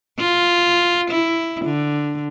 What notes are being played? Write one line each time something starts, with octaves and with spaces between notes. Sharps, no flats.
F4
E4
D3